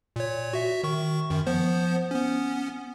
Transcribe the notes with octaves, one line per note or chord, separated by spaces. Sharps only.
A#2 C#5
F#4 E5
D#3 C#6
F#2 D#3
F3 B3 C5
B3 C#4